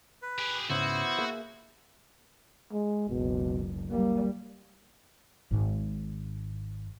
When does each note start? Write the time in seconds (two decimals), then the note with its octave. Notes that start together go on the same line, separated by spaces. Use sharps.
0.22 B4
0.39 G4 G#4
0.70 C#2 G#2 C#3 B3 E4 F#4 C5
1.19 A#3 G#4 E5
2.73 G#3
3.10 F#1 C#2 B2
3.91 G3 A#3
5.51 G#1 G#2